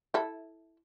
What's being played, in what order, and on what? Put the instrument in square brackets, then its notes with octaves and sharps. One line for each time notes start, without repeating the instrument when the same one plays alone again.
[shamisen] E4 A4